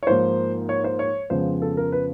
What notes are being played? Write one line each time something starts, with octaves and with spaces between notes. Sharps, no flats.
C#5
G#2 F3 A#3 C5
C#5
C5
C#5
F2 C#3 F3 G#3 B3 C5
A4
A#4
B4